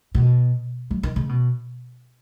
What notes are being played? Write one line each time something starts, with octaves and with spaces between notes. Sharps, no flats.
B2
F#3
D#3
C#3
B2